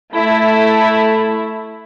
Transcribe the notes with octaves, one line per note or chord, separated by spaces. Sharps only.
A3 E4